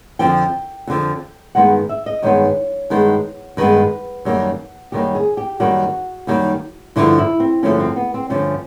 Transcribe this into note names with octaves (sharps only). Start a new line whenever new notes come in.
F2 D3 F3 G5
F2 D3 F3
G2 D#3 G#3 B3 F#5
E5
D#5
G2 D#3 G#3 B3 C#5
G2 D#3 G#3 B3
G2 D#3 G#3 B3 B4
F#2 D#3 G3 A#3
F#2 D#3 G3 A#3 G4
G#4
G4
F#2 D#3 G3 A#3 F#4
F#2 D#3 G3 A#3
G2 D3 F3 A3 E4
E4
C4
G2 D3 F3 A3 C#4
C4
B3
C4
G2 D3 F3 A3 C#4